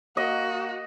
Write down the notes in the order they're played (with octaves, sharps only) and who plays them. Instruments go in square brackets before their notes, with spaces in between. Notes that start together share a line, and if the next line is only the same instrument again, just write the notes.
[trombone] A#3 [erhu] F#4 [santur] D#5